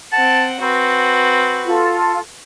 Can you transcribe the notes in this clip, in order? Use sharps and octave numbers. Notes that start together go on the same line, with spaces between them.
C4 F#5 A5
C4 F#4 B4
F4 A4